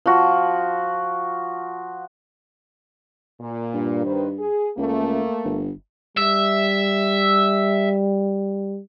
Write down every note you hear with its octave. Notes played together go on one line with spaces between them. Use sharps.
F3 F#4
A#2
G2
D#3 B4 C5
G#4
C#2 A3 A#3
G1
G3 E5